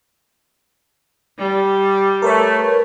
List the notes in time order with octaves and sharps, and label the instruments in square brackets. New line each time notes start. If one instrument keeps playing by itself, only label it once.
[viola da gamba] G3
[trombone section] A3 [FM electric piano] A#4 B4 C#5